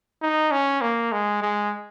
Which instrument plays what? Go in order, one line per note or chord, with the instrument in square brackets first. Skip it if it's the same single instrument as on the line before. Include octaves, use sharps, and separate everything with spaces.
[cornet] D#4
C#4
A#3
G#3
G#3